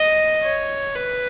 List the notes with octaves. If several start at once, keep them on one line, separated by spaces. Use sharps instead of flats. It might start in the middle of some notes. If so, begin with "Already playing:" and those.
Already playing: D#5
C#5
B4